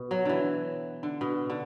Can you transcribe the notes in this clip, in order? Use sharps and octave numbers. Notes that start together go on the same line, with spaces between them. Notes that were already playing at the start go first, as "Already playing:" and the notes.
Already playing: B2
F#3
D3 E3
D3
B2
D3